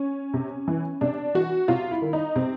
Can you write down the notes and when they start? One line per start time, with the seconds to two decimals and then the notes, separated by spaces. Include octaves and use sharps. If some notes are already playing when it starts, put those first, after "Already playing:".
Already playing: C#4
0.34 C3
0.68 E3
1.01 C3 D4
1.35 E3 F#4
1.68 C3 F4
1.91 E4
2.02 D#3
2.13 D#4
2.36 C3 C4